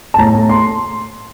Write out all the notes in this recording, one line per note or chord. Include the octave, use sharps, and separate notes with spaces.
A5
A2 A#5
A3
A3 C6